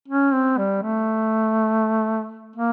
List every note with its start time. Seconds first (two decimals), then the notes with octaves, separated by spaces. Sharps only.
0.08 C#4
0.33 C4
0.58 G3
0.83 A3
2.56 A#3